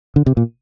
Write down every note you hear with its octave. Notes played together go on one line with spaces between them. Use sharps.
D3
C3
A#2